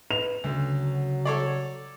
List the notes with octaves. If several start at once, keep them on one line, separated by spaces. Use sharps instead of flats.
B4 F7
D2 C#3 F#3
A4 C#5 D5